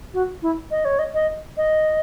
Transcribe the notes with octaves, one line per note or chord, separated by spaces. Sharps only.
F#4
E4
D#5
C#5
D#5
D#5
D#5